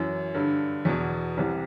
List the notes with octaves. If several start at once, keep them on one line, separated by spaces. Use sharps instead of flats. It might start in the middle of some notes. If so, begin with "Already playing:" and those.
Already playing: F#2 E3
G2 D3
E2 B2
C2 C3 E3